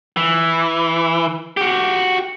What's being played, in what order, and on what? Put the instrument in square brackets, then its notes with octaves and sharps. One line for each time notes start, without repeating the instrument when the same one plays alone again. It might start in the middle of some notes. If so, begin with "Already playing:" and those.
[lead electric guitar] E3
F#4 G4